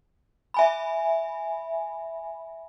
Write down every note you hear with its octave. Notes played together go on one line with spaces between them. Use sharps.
E5 G#5 B5